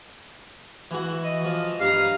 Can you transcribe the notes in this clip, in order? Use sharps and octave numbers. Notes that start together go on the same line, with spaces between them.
E3 F#4
D#5
F3
G2 F5 A#5